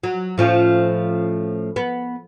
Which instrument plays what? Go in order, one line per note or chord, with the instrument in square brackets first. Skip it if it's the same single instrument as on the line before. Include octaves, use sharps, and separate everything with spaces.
[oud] F#3
A2 F3 C#4
B3